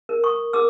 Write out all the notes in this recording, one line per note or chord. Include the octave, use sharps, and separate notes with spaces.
A#4
C#6 D#6
A#4 D6 E6